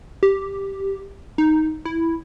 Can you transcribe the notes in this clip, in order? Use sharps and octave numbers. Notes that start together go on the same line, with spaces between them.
G4
D#4
E4